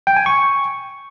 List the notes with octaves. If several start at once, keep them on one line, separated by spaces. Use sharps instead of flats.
G5
G#5
C#6